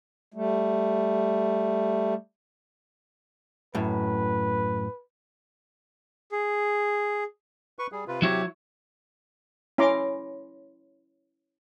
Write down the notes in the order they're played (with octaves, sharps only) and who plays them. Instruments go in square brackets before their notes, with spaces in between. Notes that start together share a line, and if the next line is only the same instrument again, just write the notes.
[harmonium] G3 A3
[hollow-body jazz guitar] F#2 A2 [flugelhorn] B4
[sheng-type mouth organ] G#4
[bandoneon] B4 C#6
G3 G#4
C3 F4 B4
[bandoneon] C3 G4 [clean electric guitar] F#3 E4 C#5
[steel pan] C#4 E4 A#5 C6 D6